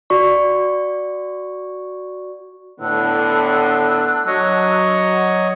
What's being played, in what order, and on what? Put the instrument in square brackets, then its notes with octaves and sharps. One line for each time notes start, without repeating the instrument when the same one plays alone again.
[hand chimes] F#4 D5 C#6
[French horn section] A2 D3 B3 [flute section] D4 E6 F#6
[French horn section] F#3 [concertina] C#5 D#5